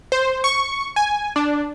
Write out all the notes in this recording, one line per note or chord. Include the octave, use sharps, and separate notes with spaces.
C5
C#6
G#5
D4